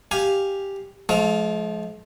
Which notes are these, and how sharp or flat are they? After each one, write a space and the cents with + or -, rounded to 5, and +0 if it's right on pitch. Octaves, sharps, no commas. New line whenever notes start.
G4 +0 F5 +0 G#5 +0
F3 +0 G#3 +45 F5 +0